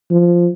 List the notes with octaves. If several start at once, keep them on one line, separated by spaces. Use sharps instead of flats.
F3